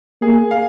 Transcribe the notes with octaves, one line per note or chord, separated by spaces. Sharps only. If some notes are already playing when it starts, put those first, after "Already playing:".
A#3 G#4
F5